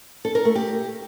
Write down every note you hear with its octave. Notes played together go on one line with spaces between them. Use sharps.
A4
A#4
A3
G4